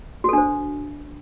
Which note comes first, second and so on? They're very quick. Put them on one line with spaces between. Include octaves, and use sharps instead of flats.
F#4 A4 D4 C5